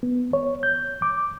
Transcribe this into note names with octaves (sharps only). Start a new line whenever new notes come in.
B3
C#5
G6
D6